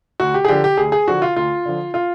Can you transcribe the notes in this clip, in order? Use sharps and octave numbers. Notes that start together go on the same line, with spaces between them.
D2 F#4
G4
G#4
D3 F3 G4
G4
D2 G#4
G#4
D3 F3 F#4
F4
D2 F4
D3 F3
F4